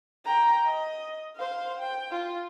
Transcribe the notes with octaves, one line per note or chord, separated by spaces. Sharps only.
G5 A#5
D#5
C5 F5
G5
F4